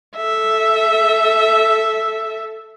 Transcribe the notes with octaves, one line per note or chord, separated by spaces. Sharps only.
A4 E5